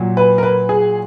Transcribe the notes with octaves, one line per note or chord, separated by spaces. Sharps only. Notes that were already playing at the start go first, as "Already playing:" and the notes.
Already playing: A#2 F#3
B4
A#4
B4
G#4